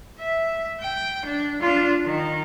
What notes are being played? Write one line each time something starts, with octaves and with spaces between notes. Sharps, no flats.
E5
G5
D4
D4 F4
D#3